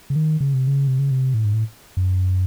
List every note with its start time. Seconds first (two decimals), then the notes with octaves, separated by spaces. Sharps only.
0.10 C#3
0.16 D#3
0.40 C#3
0.54 C3
0.68 C#3
0.88 C3
0.99 C#3
1.11 C3
1.34 A2
1.45 G#2
1.53 A2
1.97 F#2